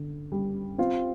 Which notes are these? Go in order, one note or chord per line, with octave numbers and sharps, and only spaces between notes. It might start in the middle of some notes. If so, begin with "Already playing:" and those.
Already playing: D3
G3
C4 F4